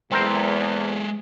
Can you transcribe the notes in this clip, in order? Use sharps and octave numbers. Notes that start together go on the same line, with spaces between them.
E2 G#3 C4 A4 A#4 C5